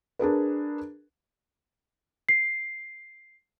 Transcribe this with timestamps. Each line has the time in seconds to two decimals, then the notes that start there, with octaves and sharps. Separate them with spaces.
0.19 D4 G#4 A#4 B4
2.29 C7